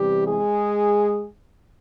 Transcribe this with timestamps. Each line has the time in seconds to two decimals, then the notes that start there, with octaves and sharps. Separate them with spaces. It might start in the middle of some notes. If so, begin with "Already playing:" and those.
Already playing: E2 C3 E3 G3 G4
0.27 G#3 G#4